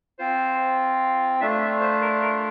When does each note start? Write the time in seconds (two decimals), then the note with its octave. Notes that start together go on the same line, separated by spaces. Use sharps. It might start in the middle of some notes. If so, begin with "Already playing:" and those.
0.19 C4 F4 C5
1.40 A3 D4 F4 E5
1.61 E5
1.81 C5
2.02 A#4
2.21 A#4